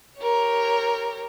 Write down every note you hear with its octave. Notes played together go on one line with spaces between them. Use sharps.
G4 A#4 C#5